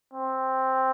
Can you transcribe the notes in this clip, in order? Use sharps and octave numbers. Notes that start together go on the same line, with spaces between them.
C4